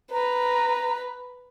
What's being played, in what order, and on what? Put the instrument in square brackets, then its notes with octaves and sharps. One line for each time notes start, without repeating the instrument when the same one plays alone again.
[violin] B4 [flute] A#5